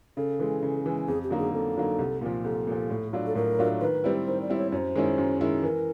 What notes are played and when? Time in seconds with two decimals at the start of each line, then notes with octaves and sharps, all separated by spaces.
0.17 C#3 A4
0.39 E3 G#3
0.63 C#3
0.86 E3 G#3
1.08 F2 G#4
1.23 G4
1.30 D3 F#3 A#3 D#4
1.39 G#4
1.53 F2 A4
1.76 D3 F#3 A#3 D#4
1.99 C2
2.21 A#2 F3
2.44 C2 A4
2.67 A#2 F3
2.90 A2
3.13 F#3 A3 D4 F4
3.27 A4
3.35 A2 A#4
3.59 F#3 A3 D4 F4
3.81 D#3 B4
4.04 G3 C4 E4
4.27 D#3 C5
4.42 D5
4.50 G3 C4 E4
4.57 C#5
4.72 F#2 C#5
4.77 C5
4.95 D#3 G#3 C#4 E4
5.18 F#2
5.41 D#3 G#3 C#4 E4
5.63 E3 A#4